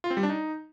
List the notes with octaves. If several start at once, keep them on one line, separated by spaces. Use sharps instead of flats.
F4
C4
G3
D4
D#4